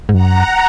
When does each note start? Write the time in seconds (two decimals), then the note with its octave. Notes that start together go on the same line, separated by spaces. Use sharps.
0.09 G#2
0.13 F#2 F#5 A#5